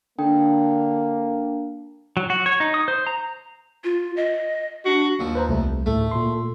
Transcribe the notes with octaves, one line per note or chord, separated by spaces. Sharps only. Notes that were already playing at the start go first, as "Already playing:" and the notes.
D3 A#3 D4 G5
F#3
F#4
C#5
D#4
D#6
C5
A#5
F4
D#5
D4 F#4
D#2 F3
B4 C5 A#5
C2 A3
D2 A2 A3
A#2 A4 C6